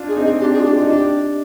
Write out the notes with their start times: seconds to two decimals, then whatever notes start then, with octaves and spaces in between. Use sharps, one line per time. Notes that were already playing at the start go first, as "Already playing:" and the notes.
Already playing: D4 F4
0.08 G#4
0.17 C4 D#4
0.24 G#4
0.29 C4
0.41 D4 G4
0.53 G#4
0.60 F4
0.64 D4 G4
0.77 F4
0.82 D#4
0.89 D4 G4